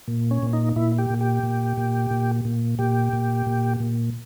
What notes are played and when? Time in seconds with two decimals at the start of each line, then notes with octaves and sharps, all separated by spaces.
0.08 A#2
0.31 C#4
0.43 A#2
0.53 D#4
0.76 A#2 E4
0.98 G4
1.10 A#2
1.21 G4
1.43 A#2
1.77 A#2
2.11 A#2
2.45 A#2
2.79 A#2 G4
3.13 A#2
3.46 A#2
3.80 A#2